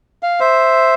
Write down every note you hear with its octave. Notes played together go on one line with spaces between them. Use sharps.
F5
C5 E5